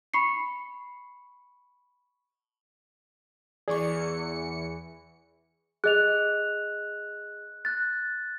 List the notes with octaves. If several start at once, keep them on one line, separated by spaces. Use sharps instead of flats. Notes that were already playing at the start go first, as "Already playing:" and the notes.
B5 C#6 C7 C#7
E2 E3 G#4 D5 C#6 C#7
G#4 D#5 F#6 F7
F#6 A6